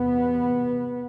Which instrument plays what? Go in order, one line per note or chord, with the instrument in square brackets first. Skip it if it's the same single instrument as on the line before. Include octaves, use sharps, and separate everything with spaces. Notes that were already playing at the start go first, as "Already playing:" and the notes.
Already playing: [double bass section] E2 C3 B3